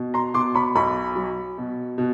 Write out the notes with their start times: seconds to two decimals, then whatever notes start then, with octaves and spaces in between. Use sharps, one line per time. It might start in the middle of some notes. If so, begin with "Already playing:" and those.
Already playing: B2
0.14 A#5 C6
0.34 B2 C6 D6
0.55 B5 C#6
0.75 B1 B5 C#6
1.16 F#3
1.58 B2
1.98 B2